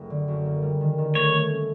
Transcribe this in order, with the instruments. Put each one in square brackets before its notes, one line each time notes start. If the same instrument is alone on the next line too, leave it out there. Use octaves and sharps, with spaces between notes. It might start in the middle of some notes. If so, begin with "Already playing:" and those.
Already playing: [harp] F#1 A3
D3
F#2
A#3
G3
D#3
D#3
[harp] A3 [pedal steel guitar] C#5
[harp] A3
C#4